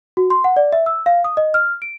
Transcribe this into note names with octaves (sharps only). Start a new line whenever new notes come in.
F#4
C6
F#5
D5
E5
E6
F5
D#6
D#5
F6
D7